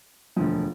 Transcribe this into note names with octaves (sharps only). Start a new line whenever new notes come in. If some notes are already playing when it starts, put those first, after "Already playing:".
E1 D2 D3 F3